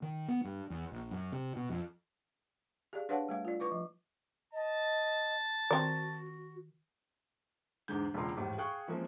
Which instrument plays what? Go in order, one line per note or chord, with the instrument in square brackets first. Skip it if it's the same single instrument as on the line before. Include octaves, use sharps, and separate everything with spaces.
[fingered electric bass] D#3
B3
G2
E2
A#1
F#2
C3
B2
F2
[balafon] G4 G#4 D5 F5
D4 B4 C#5 F5 F#5 A5
G3 A3 F5
F4 D5
E4 B4 C#6 D6
F3
[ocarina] D#5 [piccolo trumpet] A5
[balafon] D#3 [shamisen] C4 D5 [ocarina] F#4
[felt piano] E2 G#2 D3 G#3 G6
E1 C#2 A#2 A#4 C6
G#1 E2 A2 G3
G#4 F5 G5 C#6 F#6
E3 F3 G#3 A#3 C4 C#4